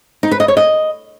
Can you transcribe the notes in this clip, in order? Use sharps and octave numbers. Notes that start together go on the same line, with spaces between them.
D#4
B4
D#5
C#5
D#5